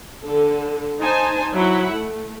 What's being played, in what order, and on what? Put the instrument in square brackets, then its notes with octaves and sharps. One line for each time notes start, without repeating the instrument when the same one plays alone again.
[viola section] D3 A4
D#4 C5 G#5 A5
F#3 E4 E5 F#5 B5
A3